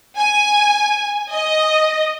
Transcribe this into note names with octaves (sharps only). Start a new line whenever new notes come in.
G#5
D#5